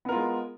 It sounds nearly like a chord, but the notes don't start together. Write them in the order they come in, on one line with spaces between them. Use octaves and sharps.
B3 A#4 F4 G#3